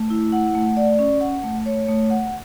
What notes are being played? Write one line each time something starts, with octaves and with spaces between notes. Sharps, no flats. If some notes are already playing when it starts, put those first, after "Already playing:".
Already playing: A3
E4
F#5
A3
D5
C#4
F#5
A3
C#5
A3
F#5